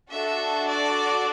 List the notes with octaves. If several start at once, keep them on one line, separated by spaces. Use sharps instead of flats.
D4 F#4 A4 E5
D5